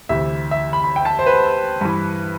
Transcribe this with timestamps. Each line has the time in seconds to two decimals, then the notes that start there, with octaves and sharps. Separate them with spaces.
0.09 D2 C3 E3 E5
0.51 E5
0.73 B5
0.84 B5
0.96 G5
1.05 A5
1.19 C5
1.26 B4
1.81 G2 E3